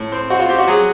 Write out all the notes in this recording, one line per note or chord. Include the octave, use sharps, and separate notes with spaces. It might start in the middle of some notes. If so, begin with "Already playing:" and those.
Already playing: A2
C4
C4 F#4
F4
C4 G4
F#4
F#3 G#4